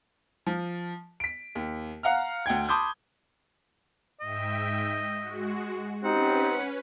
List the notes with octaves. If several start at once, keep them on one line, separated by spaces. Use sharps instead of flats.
F3
B6 D7
D#2
F5 F#5 A#5 F6
D2 F#5 G5 G#6
A5 B5 C6 D6 D#6 G6
G#2 D#5 E5 G5
G#3 F#4
C4 C#4 D#4 G4 B4 F#5